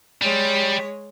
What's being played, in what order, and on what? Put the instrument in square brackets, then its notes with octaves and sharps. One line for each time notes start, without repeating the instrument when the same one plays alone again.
[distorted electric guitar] G3 [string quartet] G#3 C#5